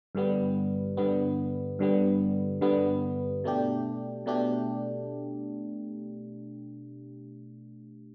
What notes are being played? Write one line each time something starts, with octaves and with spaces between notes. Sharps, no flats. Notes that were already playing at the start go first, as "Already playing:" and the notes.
G2 D3 G3 B3
G2 D3 G3 B3
G2 D3 G3 B3
G2 D3 G3 B3
B2 A3 D4 G4
B2 A3 D4 G4